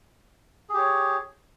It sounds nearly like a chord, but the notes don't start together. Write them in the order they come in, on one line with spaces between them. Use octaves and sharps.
G#4 G4 C#5